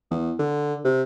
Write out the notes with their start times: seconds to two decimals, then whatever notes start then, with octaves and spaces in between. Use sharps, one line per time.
0.11 E2
0.39 D3
0.85 C3